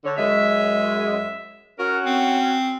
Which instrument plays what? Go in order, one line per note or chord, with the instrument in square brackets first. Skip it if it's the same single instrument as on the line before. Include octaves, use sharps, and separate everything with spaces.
[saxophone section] D3 C#5
[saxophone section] F#2 G#3 [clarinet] E5
[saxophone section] C#4 F#4 [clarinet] A#4
[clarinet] C4